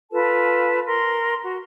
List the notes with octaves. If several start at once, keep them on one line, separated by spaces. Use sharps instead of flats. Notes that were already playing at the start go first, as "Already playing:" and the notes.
F4 A4 B4 A5
A#4 C6
F#4